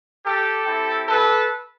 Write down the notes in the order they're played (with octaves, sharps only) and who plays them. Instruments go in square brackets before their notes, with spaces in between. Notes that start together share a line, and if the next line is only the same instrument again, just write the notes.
[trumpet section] G4 A4
C4 E4 G4
A4 B4